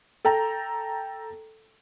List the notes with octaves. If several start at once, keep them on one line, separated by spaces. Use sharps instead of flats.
A4 G5 A#5